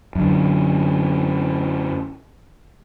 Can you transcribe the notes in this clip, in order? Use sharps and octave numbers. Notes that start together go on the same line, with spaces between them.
F#2 D3